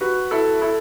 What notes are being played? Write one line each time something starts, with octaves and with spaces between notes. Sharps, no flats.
F#4 B4
E4 A4
E4 A4